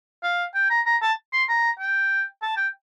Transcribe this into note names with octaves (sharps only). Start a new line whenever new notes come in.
F5
G5
A#5
A#5
A5
C6
A#5
G5
A5
G5